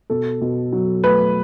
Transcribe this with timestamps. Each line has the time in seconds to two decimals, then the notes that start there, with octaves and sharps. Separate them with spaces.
0.10 B2 A4
0.41 B2
0.73 F#3
1.04 A3 B4